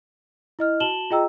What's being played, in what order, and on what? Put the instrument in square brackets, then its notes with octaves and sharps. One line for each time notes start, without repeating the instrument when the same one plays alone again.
[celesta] E4 D#5 F6
F#4 A5 E7 F#7 G7
F4 G#4 D#5 G5 A#5 E6